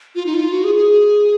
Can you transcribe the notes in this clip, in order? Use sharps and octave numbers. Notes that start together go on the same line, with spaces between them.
F4
D#4
F4
F#4
G#4
G#4